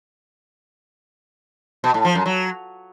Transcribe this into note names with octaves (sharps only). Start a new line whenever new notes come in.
B2
A2
F3
F#2
F#3